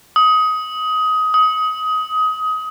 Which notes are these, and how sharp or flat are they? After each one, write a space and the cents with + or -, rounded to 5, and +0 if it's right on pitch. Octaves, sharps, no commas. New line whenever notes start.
D#6 +20
D#6 +25